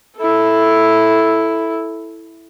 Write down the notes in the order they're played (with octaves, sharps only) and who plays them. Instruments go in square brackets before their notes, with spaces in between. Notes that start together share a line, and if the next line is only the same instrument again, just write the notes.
[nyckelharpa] E4 A4